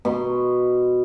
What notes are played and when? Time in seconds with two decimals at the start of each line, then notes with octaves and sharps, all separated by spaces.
0.05 B2 C6